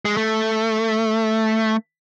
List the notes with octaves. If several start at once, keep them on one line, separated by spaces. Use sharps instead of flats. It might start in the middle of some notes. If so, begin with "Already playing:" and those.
G#3
A3